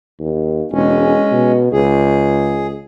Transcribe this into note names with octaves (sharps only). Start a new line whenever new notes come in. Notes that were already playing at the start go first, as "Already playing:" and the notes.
D#2
E1 G#3 C#4
B2
C#2 G#4